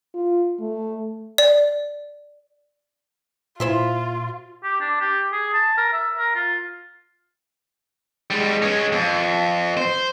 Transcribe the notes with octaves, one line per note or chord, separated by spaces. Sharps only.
F4
A3
D5
A#2 E4 F4 C5 E5
G4
D4
G4
G#4
A5
A#4
E5
A#4
F4
G3 G#3
G#3 C#4
F2
C5